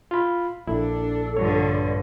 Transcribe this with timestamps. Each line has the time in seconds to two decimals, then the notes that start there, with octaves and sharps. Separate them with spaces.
0.11 F4 B5
0.67 A#1 D4 E4 A4
1.37 G2 D3 F3 G3 C#5